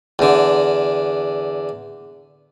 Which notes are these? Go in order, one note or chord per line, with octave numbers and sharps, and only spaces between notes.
E2 D3